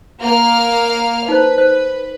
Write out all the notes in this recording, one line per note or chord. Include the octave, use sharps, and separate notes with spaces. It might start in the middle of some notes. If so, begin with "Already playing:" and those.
A#3 F5 F6
D#4 B4 C5
C5